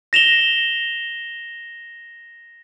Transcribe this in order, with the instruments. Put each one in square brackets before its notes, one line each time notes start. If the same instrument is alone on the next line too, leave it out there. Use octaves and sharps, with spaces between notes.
[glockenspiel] A#6 E7 F7 G7